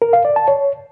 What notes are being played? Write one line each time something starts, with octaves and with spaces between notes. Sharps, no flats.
A#4
F5
D5
A5
C#5